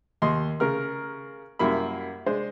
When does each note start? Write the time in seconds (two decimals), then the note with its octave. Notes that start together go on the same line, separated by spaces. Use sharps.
0.22 D#2 D#5 C6
0.60 C#3 A#4 F6
1.59 F#2 G3 A#3 E4 B5
2.26 G#3 D4 C5